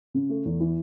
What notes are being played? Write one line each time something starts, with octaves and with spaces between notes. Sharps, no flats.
C#3
A3
E2
E3